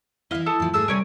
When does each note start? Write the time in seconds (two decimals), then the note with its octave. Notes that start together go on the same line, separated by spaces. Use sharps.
0.31 E3 E4 D#5 F5
0.46 A4 A5 D#6
0.60 A2 F3
0.73 G#2 A3 G#4 A5 E6
0.88 C3 G3 A#4 C#5 G#5